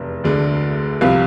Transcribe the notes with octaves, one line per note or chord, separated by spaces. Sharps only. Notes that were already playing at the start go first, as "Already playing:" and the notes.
Already playing: F1 E2 C3
D2 D3 G#3
C2 C3 F3 F5